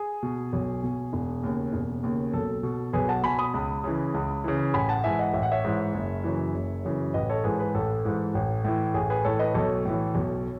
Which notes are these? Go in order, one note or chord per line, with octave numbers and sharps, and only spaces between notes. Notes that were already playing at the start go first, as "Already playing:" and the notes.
Already playing: G#4
B2
B1
B2
E1
D#2 C#3
E1
D#2 C#3
B1 A4
B2
B1 G#4 B4
F#5 A5
B2 G#5 B5
B5 D#6
C#2
C#3 E3
C#2
C#3 E3
A1 G#5 B5
F#5 A5
G#2 E3 E5 G#5
D#5 F#5
A1 E5
F#5
C#5 E5
G#2 E3
F#1
F#2 C#3 E3
F#1
F#2 C#3 E3
A1 B4 D#5
A4 C#5
G#2 E3 G#4 B4
G#4 B4
A1 A4
G#2 E3
A1
A2 E3
A1 G#4
G#4 B4
A2 E3 A4 C#5
B4 D#5
B1 A4 C#5
A2 E3
B1